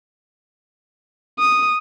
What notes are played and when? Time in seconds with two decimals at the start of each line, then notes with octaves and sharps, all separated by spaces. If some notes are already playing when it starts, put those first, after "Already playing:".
1.39 D#6